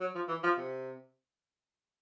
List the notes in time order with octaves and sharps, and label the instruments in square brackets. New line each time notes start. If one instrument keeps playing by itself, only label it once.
[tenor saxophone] F#3
F3
E3
F3
C3